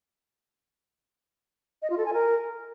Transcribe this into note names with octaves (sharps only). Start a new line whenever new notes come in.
D#5
F4
A4
G#5
A#4